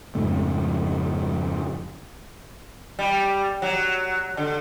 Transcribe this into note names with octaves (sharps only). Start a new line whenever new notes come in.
F2 G#2 C#3 A3
G3
F#3
D3